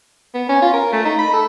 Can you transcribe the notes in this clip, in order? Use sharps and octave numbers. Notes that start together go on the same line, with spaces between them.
B3
C#4
F4
A#4
A3
D#4
B5
A4